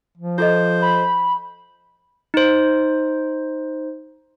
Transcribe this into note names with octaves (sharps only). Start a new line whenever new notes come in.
F3
F4 A4 C5 D#5
B5
D#4 C5